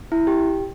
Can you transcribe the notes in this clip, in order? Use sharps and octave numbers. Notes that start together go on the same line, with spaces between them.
E4
G4